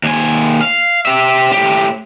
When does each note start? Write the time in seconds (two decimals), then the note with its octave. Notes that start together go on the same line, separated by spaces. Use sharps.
0.04 D#2 G#5
0.61 F5
1.06 G4 E5
1.53 A2 G4